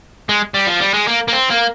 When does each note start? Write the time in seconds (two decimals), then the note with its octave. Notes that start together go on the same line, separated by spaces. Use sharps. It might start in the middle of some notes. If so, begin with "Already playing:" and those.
0.29 G#3
0.54 G3
0.67 F3
0.80 G3
0.94 G#3
1.07 A#3
1.28 A#3
1.33 C4
1.50 A#3